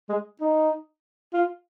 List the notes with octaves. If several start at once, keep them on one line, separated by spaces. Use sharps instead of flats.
G#3
D#4
F4